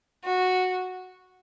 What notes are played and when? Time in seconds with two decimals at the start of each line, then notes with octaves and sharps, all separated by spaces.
0.24 F#4